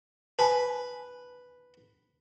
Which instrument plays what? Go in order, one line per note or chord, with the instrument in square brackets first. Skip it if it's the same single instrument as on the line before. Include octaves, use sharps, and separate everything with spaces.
[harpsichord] B4 [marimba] G#5 A5